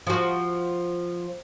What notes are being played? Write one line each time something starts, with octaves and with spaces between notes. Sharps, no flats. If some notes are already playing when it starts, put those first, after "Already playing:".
F3 F#4